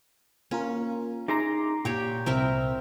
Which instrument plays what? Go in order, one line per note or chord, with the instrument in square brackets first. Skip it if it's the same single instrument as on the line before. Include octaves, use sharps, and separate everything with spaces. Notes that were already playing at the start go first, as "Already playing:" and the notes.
[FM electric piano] A#3 F4 A#4 [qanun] C#4
[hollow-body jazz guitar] D#4 G#4 E5 [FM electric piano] A#5 C6 D6
[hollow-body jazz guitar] A#2 [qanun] G4 C#5 G5
[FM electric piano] C2 [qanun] C4 A#4 E5